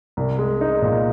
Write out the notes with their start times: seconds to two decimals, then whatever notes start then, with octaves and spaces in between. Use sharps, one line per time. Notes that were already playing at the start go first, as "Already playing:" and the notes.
0.17 C2
0.39 G#3
0.61 D#4
0.82 A#2